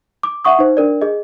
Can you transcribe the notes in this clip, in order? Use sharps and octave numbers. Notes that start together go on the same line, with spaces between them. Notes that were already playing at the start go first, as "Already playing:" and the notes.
D6
E5 F#5 C#6 D#6
D#4 C5
D4 A#4 D5
G#4 D#5